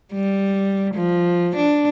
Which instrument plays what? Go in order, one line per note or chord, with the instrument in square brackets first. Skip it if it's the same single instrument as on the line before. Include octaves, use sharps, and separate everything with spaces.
[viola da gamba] G3
F3
D4